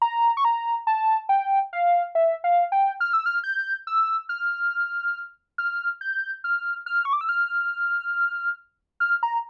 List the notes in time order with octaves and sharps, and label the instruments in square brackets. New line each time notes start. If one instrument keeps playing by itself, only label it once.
[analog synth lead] A#5
C#6
A#5
A5
G5
F5
E5
F5
G5
F6
E6
F6
G6
E6
F6
F6
G6
F6
F6
C#6
D6
E6
F6
F6
A#5